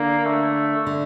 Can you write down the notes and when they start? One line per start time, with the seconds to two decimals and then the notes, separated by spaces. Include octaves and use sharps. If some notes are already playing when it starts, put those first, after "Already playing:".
Already playing: D3 A#3
0.25 A3
0.87 D3